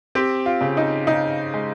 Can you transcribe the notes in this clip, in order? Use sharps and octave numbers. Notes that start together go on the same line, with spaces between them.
C4 G4
F4
C#3
D#4
C#3 D#4
G#3